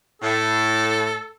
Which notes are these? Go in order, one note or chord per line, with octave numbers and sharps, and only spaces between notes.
A2 A4